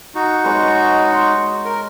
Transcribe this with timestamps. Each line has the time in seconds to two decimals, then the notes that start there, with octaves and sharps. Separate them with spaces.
0.15 D#4 F#4
0.44 G#3 B4 C#5
1.12 C6
1.65 A#4